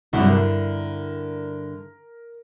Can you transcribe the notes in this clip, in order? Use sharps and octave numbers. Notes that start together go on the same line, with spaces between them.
C2 G2 D3 F#3 E4 F#5
A#4